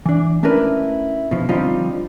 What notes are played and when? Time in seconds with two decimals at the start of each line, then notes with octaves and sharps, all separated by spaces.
0.06 E3 D4
0.43 A3 C#4 D4 E4 A#4 B4
1.31 B2 F3
1.49 D3 F3 G3 C4 D#4 F4